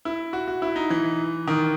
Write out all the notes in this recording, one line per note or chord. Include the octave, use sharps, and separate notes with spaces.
E4
F#4
F#4
E4
D#4
E3
D#3